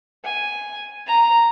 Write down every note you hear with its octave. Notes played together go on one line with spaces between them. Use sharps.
G#5
A#5